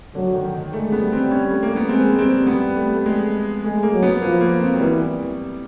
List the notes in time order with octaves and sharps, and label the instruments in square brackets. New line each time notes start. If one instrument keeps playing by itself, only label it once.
[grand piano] D3 [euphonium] F#3
[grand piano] D#3
D#3
[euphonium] G#3 [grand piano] A3
[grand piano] B3
[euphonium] G3
[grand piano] C4
C#4
A3
A#3
B3
[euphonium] G#3 [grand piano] C4
[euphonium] G3 [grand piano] C4
[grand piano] B3
A3
A3
G#3
[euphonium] G#3 [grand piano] A3
[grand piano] A#3
[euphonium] F#3
[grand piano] B3
[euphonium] F3 [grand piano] A#3
[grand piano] A#3
C4
F#3
[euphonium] E3 [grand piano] G3